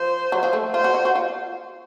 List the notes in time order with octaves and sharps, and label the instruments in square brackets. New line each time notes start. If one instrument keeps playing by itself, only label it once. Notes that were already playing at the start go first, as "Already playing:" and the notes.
Already playing: [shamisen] F3 [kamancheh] C5
[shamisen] F#3
F3
A3
[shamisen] F4 [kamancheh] C5
[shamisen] F#4
F#4
F#4
F4